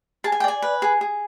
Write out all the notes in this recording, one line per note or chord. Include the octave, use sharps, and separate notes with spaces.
G#4 A5
G#5
G5
D5 G#5
B4
G#4
G#4